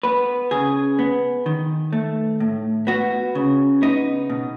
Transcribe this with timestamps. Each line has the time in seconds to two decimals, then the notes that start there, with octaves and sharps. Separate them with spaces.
0.03 B3 B4
0.51 C#3 G#4
0.99 B3
1.46 D#3
1.92 A3
2.40 A2
2.87 B3 F#4
3.35 C#3
3.82 B3 D#4
4.30 B2